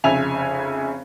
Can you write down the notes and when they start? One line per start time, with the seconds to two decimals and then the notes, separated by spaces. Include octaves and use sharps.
0.04 F1 C#3 E5 G#5 F7